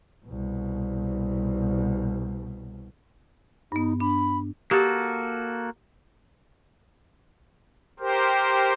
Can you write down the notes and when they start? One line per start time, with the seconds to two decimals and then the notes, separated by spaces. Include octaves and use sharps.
0.26 C2 B2
3.72 G2 B3 D#4
4.00 D4 B5
4.71 A#3 F#4 G4 A4
7.99 G4 A#4 C5